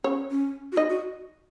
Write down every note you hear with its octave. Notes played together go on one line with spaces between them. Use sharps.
C#4 C#5
C#4
F#4
D#4 D#5
F#4